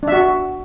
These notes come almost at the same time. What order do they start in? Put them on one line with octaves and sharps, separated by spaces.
D4 E5 F#4